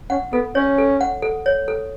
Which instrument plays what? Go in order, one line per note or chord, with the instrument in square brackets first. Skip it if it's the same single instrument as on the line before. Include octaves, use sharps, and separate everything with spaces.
[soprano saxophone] C#4 [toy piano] F#5
[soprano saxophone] B3 [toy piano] A4
[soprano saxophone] C#4 [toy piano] C#5
[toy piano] A4
F#5
A4
C#5
A4